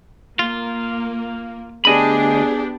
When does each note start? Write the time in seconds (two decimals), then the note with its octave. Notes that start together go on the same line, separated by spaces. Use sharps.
0.39 A#3 F4
1.85 D2 B3 D4 G4 G#4 D#5 B5